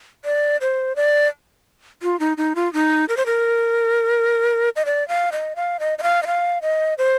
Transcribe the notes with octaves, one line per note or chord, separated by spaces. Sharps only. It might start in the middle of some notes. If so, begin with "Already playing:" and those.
D5
C5
D5
F4
D#4
D#4
F4
D#4
A#4
C5
A#4
D#5
D5
F5
D#5
F5
D#5
D#5
F5
D#5
F5
D#5
C5